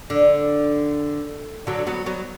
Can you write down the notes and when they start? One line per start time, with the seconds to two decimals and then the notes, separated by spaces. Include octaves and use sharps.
0.10 D3
1.67 D3 F#3
1.87 F#3 B3
2.06 F#3 B3